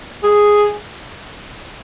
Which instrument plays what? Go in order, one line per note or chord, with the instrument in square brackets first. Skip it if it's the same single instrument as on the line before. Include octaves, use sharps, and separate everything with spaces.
[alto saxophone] G#4